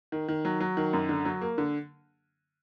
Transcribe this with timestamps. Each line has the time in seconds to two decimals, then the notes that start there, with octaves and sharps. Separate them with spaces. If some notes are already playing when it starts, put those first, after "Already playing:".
0.12 D#3
0.28 D#3
0.45 F#3
0.60 F#3
0.77 D#3
0.93 F#2
1.09 D3
1.25 F#3
1.41 A#3
1.58 D3